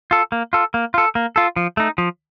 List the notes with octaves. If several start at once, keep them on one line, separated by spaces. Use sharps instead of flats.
F4 A4
A#3
F4 A4
A#3
F4 A4
A#3
F4 A4
F3
A3 D#4
F3